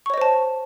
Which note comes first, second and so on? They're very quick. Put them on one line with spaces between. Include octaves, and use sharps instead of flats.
C#6 C#5 D#5 C5 A5